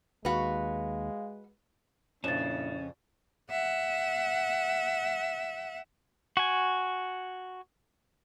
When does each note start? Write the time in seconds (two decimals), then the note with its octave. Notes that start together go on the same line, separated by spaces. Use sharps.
0.25 D#2 G#3 F#4 B4 F5
2.24 F2 A#2 C#3 C#4 D4 E4 A6 E7
3.51 E5 F#5
6.37 F#4 G#5